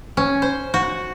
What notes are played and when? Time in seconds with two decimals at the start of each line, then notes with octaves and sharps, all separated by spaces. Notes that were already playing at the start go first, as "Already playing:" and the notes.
0.17 C#4
0.42 C5
0.74 F#4